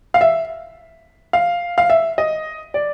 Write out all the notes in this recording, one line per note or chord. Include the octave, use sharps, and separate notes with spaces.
F5
E5
F5
F5
E5
D#5
D5